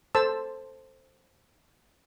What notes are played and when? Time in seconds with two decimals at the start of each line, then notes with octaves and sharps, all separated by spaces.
0.15 A4 C5 A5 E6